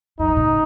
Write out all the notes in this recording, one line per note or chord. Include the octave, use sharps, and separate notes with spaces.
F#2 D#4
G#2
A#2
C#3